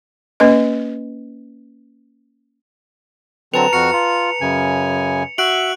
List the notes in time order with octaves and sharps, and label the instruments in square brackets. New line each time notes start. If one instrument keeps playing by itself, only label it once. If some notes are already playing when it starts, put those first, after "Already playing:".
[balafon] A#3 C#4 B4 D#5
[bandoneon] D3 F#3 C4 [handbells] B4 A5 A#5 [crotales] F7
[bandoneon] F2 F#4 F6 [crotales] C#7
[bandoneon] F4
F#2 C#3 G#5
[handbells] F#4 F#5 [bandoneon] E5 [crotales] F#6 D7 F#7